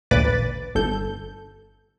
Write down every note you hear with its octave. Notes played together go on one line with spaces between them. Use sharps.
A1 D2 A#2 B4 D6 A6
G1 A4 G6